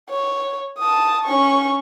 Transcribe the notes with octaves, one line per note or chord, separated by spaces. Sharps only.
C#5
A5 D#6
C#4 C#6